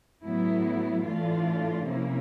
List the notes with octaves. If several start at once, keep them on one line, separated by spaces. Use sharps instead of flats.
A2 F#3 B3 E4
A2 E3 A3 D4 F4
C3 F3 A#3 C#4 E4